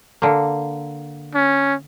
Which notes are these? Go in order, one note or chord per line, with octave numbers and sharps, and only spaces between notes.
D3 A#3
C#4